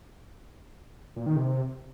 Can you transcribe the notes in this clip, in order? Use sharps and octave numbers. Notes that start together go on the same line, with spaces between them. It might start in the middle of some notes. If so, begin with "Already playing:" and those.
A#2
D#3
C3